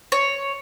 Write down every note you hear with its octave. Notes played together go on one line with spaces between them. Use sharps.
C#5